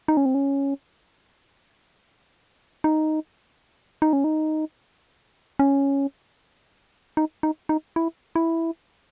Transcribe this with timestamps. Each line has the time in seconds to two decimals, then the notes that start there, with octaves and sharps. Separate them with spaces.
0.08 D#4
0.17 C#4
0.26 C4
0.35 C#4
2.84 D#4
4.02 D#4
4.13 C#4
4.24 D#4
5.59 C#4
7.17 D#4
7.43 D#4
7.69 D#4
7.96 E4
8.36 E4